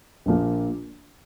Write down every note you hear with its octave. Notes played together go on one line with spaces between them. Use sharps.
A#1 A#2 F3 A#3